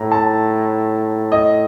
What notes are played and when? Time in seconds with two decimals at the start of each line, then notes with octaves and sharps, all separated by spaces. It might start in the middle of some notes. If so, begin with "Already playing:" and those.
Already playing: A2 A#5
0.12 A5
1.32 D#5